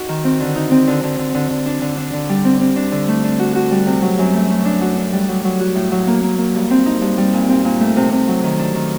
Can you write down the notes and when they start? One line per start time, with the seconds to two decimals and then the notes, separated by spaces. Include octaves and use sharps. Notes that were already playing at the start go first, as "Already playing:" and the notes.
Already playing: D#4 F#4
0.09 D#3
0.24 C4
0.40 D3
0.56 D#4
0.71 C4
0.87 D3
1.03 D3
1.19 D3
1.35 D3
1.50 D3
1.66 D4
1.82 D3
1.97 D4
2.13 D3
2.29 G3
2.45 C4
2.61 C4
2.76 D4
2.92 D3
3.08 A3
3.24 D4
3.39 F#4
3.55 F#4
3.71 G3
3.86 C3
4.02 F#3
4.19 F#2
4.33 A3
4.50 A3
4.65 D4
4.81 F#4
4.97 D4
5.13 G3
5.28 F#3
5.44 F#3
5.60 F#4
5.75 A2
5.92 F#3
6.07 A#3
6.23 A#3
6.38 A#3
6.54 G2
6.71 C4
6.86 D#4
7.02 G2
7.18 G3
7.33 A#2
7.49 C4
7.65 A#2
7.81 A3
7.96 C3
8.12 C3
8.28 F#3
8.43 D#3
8.59 D4
8.75 D#3